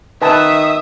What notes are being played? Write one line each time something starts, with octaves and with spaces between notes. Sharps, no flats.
D#3 B4 E5 G#5 A5 D#6